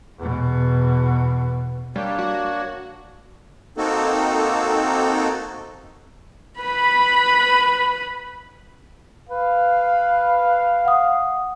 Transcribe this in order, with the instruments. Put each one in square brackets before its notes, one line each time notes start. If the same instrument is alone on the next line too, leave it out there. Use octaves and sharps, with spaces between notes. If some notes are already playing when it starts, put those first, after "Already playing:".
[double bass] E2 B2
[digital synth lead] G3 [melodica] A#3 D4 C#5
[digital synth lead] F#4
[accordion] A#3 C4 D#4 F#4 A4
[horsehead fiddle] B4 B5
[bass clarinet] B4 [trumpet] F5
[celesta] F#5 D#6